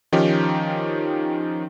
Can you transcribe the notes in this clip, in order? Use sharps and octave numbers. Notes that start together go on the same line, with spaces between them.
D#3 F3 C#4 D#4 G4